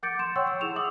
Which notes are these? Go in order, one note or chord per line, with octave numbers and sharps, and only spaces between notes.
F#5 D6 G6 A6 C#7 D7
C6 E7
C#5 F#5 G5 C6 C#6 E6
E6
E4 G#4 E6 E7 F7
E5 F#5 D6 D#6 F#7